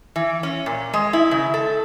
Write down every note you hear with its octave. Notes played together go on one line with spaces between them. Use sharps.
E3
C#4
A#2
G#3
E4
C#3
A4